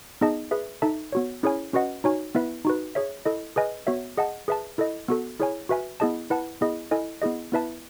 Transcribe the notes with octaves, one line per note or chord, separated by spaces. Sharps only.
B3 D#4 G#4 D#5 A5
G#4 B4 E5
D#4 A4 E5 A5
B3 F#4 C#5
C#4 E4 G#4 C#5 G#5
C#4 F#4 B4 D#5 F#5
D#4 F#4 C#5 G#5
B3 E4 B4 E5
D#4 F#4 B4
G#4 C#5 E5
E4 A4 D#5
G#4 B4 D#5 G#5
B3 F#4 C#5 E5
G#4 D#5 F#5 A5
G#4 B4 E5 A5
E4 A4 D#5
B3 F#4 A4
E4 G#4 C#5 G#5
F#4 B4 E5 G#5
B3 E4 G#4 D#5 A5
E4 B4 F#5 A5
B3 E4 G#4 D#5
E4 A4 D#5 G#5
B3 E4 G#4 D#5
B3 E4 B4 E5 A5